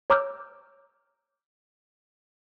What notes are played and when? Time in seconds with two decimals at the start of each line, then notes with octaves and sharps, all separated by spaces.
0.10 C#5 A#5 D6 E6 F6 G6